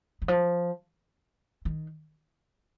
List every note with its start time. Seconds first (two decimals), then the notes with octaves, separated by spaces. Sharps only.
0.22 D#3
0.28 F3
1.65 D#3